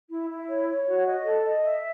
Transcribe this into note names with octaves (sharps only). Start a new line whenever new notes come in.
E4
E4
C#5
C#5
F#4
D#5
A4
D#5
E5